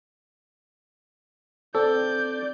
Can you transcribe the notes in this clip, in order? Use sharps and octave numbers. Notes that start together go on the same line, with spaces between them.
C4 A4 D5 G6